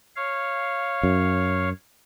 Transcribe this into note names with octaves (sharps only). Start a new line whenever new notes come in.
C#5 F5
F#2